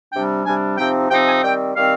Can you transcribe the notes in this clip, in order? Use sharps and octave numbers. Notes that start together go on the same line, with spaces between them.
C3 G3 D4 G5
C3 G3 D4 G#5
C3 F3 C4 D#4 G5
C3 F3 C4 D#4 G5
G#5
D#3 G3 C4 G5
D#3 G3 C4 F5